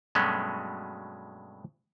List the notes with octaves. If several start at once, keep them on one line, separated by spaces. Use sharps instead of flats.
G2 B2 F#3 G#3 A3 C#4